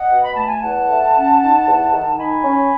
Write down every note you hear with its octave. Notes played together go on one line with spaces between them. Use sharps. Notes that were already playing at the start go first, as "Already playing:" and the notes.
Already playing: D#5 F#5
B2
B5
A3 A5
G#5
E2 F#5 A5
A3
C#4
D#3
E2
D#3
D#3 G#5 B5
C#4